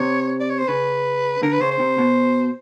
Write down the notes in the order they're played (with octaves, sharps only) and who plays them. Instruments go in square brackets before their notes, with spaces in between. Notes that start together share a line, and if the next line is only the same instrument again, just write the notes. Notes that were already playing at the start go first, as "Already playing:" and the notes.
Already playing: [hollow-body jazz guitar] C3 [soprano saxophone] C#5
[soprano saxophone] D5
C#5
C5
[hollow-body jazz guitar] C#3 [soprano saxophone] B4
[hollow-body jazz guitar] D3 [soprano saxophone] A#4
[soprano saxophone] B4
[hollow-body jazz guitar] C#3 [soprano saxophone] C5
[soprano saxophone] C5
[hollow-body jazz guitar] C3
B2